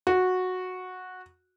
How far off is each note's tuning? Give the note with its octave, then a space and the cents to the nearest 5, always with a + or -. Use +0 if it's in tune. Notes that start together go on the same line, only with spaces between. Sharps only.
F#4 -10